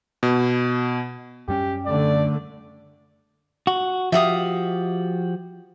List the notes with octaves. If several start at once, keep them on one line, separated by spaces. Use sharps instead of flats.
B2
F#2 G3 C#4 G4
D3 A3 D5
F#4
F3 F#4 G4 E5 F5 D#6